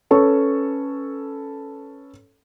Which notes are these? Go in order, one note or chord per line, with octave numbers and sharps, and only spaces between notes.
C#4 A4 B4 C#6